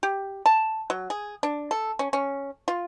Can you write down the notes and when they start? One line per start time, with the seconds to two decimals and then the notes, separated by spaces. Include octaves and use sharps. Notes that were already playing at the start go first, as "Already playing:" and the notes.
0.03 G4
0.46 A5
0.90 F#3
1.10 G#4
1.43 D4
1.71 A4
1.99 C#4
2.13 C#4
2.68 F4